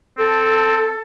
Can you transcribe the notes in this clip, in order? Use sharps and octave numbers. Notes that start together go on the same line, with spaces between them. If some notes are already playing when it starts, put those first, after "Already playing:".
C4 A4